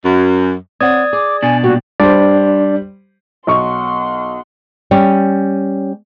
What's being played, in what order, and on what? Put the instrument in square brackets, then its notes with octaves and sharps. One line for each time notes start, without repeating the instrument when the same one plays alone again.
[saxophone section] F#2
[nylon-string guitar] C4 C#5 F#5 [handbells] D5 D#6 G#6
[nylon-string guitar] G#4 [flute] D6
[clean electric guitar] B2 D4 [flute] G#5
[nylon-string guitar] A#2 G3 G4 [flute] F#4
[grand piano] G3 C5 [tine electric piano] D4 D5
[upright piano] B1 C#6 [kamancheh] F#5 C6
[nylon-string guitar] G3 C#4